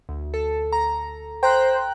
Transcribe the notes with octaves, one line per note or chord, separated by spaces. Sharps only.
D2
A4
A#5
C5 G5 A#5 F#6